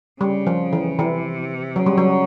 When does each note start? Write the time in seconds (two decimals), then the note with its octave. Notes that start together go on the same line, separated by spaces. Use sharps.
0.21 C#3 G3
0.47 F3
0.73 E3
0.99 C3 E3
1.76 C#3 F#3
1.86 G3
1.98 F#3